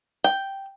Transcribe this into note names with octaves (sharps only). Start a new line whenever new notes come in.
G5